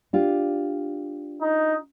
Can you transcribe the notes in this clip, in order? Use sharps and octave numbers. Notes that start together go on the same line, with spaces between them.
D4 F4 G4
D#4